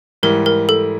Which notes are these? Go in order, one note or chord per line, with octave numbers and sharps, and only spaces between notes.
G#2 E3 G3 A#4
A#4
A4